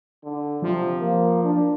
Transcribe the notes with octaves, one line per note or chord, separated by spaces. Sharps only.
D3
C3 F3
A#3
D4